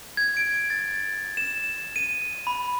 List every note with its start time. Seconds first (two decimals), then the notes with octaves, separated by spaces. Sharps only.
0.17 G#6
0.37 D7
0.70 A6
1.37 E7
1.96 D#7
2.47 B5